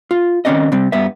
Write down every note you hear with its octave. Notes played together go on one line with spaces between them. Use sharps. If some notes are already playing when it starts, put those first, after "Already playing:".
F4
D#3 F3 C4 C#4 D5 D#5
C3 G3 C4
G2 B3 E5